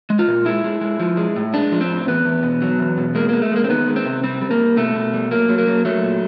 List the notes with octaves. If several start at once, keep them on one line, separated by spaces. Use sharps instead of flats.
G#3
F4
A#2
G#3 E4
G#3
G#3
F3
G#3
A2
G#3 D4
F3
C4
A2
E2 B3
E2
B2
F#3
E2
B2
G#3 A#3
G#3 A#3
A3
G#3 A#3
C4
D#3 B3
G#3
C4
C3
G3 C4
G3
A#3
G3
B2 A3
B2
G3
F#3 A#3
F#3
A#3
F#3
F#3 A3
A#2